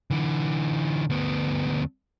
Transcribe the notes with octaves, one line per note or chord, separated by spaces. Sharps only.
D3 E3
D2 B3